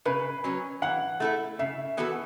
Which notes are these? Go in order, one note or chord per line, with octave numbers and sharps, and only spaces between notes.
C#3 B4
F#3 C#4
E3 F#5
A3 E4 A4
C#3 E5
E3 B3 F#4 A4